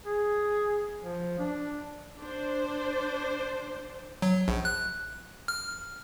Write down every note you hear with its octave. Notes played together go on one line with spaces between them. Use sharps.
G#4
F3
D4
D4 C5
F#3
A#1
F#6
F6